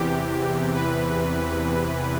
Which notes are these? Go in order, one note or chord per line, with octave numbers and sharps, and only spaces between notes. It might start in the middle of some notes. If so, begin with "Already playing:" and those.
Already playing: E2 C3 E3 G4
B4